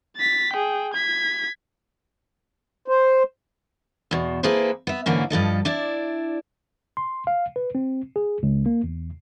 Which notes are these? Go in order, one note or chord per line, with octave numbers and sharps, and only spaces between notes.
A6 B6
G#4 G5
G#6 B6
C5
E2 B2
A#3 E4 G#4 A4 B4 C5
B3 E5
G#2 D3 E3 A#3 C#4
G2 F3 A4 D#5
D4 E4 D5
C6
F5
B4
C4
G#4
C#2
A#3
E2